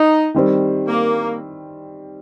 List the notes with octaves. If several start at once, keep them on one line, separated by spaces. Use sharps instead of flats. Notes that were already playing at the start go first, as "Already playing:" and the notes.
Already playing: D#4
D#3 G3 C4
A#3